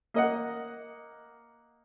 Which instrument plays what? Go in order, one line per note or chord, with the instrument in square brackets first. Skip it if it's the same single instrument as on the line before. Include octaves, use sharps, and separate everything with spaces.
[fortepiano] A#3 D#5 F#5